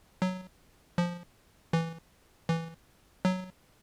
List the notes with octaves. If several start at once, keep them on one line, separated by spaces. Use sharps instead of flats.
F#3
F3
E3
E3
F#3